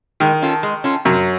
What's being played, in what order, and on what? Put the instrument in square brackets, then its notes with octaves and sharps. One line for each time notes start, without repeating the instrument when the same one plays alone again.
[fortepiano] D#3 [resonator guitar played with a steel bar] G#3
[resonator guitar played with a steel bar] C#4 F4 A4
G#3
C#4 F4 A4
[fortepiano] F#2 F#3 [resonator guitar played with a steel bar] C3